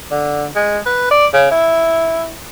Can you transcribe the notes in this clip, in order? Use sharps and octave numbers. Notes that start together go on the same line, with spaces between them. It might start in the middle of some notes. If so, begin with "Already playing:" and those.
D3
G#3
B4
D5
C#3
E4